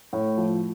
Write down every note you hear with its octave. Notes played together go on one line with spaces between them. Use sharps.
A2
F3